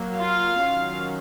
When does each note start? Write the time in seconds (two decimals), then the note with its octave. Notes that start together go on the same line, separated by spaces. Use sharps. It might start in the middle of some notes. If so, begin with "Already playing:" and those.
Already playing: F#3 A#3
0.18 F4 F5
0.61 D#3 F#3 C#4 F4